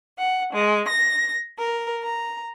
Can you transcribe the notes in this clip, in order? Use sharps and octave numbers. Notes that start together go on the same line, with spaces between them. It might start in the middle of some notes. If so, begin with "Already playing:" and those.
F#5
G#3
A#6
A#4
A#5